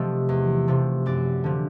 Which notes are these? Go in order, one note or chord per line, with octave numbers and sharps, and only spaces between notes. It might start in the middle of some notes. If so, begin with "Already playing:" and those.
Already playing: C3 F3 A3 D#5
E2
C3 F3 A3
F#2 D5
D3 F3